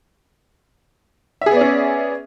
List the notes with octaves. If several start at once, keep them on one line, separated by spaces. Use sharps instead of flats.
B3 C#4 G#4 D5 E5